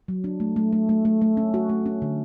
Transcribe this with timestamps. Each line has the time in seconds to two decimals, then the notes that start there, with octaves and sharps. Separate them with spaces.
0.08 F#3
0.24 D4
0.40 A3
0.56 A3
0.73 A3
0.89 A3
1.05 A3
1.22 A3
1.37 C#4
1.54 F#4
1.69 A3
1.86 C#4
2.02 D3